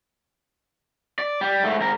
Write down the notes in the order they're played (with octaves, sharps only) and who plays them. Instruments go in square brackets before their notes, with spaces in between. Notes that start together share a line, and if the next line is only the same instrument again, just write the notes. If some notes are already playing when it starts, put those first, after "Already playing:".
[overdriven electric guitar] D5
G3
G#2 A3
G#2 A#4